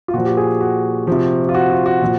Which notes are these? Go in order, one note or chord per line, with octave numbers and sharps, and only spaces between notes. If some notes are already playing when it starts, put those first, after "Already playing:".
F4
A#2 F3 F#4
G4
G#4
F#4
C3 F3
F4
F#4
F4
F#4
A#2 F3